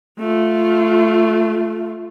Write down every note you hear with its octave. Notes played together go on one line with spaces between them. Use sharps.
A3 F4